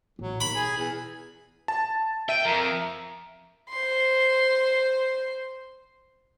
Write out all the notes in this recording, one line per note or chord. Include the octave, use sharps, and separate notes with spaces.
A1 F#3
D#2 B2 B5
G#4
E2
A5
E5 G5 D#7
F2 A#4
C5 C6